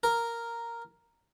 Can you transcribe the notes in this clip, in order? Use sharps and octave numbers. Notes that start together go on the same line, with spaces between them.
A#4